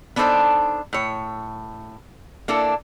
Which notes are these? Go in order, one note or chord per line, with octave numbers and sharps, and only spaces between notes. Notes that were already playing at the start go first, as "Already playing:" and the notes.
B3 D4 D#4 A4 C5
A2 C#5
A#3 D4 E4 A4